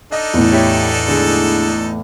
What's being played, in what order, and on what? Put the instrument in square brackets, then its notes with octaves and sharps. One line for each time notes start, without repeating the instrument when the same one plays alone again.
[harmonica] D4 D#4 A4 [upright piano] D#5
[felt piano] E2 A2
[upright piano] E4 G4 C#5
D3 G#3